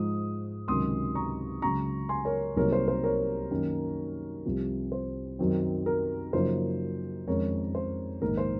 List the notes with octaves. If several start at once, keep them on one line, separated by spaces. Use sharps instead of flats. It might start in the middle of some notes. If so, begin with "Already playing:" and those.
Already playing: G#2 F3 G#3 D#4 D#6
C#2 C3 D#3 F#3 C#4 C6 D#6
A#5 C#6
C#2 C#3 F#3 A#5 C#6
G#5 C6
A#4 C#5
C2 C3 F#3 A#3 D#4 A#4 C#5
C5
C5
A#4 C#5
F#2 D#3 A#3 C#4
C2 C3 F3
C5
F#2 D#3 F#3 C4
A#4
F#2 C#3 F3 A#3 D#4 C5
F2 D#3 G#3 C#4 A#4 C#5
C5
A#1 G#2 D#3 A#3 A#4
C5